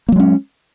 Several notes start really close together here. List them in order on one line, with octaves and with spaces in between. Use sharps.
A#3 F#3 G#3 C#4